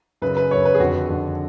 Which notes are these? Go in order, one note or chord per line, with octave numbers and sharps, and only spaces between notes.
F#2 C#3 B4
B4
F#2 C#3 C#5
B4
G#4
F2 D3 F#4
F2 D3